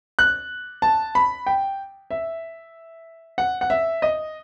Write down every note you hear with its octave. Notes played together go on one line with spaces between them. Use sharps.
F#6
A5
B5
G5
E5
F#5
F#5
E5
D#5